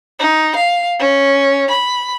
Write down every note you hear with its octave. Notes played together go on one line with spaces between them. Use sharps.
D#4
F5
C#4
B5